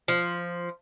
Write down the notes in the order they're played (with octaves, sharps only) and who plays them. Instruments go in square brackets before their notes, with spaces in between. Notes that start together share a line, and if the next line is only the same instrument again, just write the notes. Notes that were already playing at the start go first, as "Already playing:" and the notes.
[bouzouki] F3